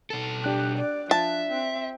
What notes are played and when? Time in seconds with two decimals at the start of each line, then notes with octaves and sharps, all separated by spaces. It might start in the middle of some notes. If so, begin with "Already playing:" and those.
0.10 B2 A4
0.44 D4 G4 F#6
0.78 D5
1.11 F3 E5 A5
1.49 C4